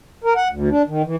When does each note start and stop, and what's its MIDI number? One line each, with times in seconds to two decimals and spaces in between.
0.24 0.34 70
0.36 0.48 78
0.51 0.69 38
0.70 0.82 62
0.87 1.02 51
1.04 1.16 52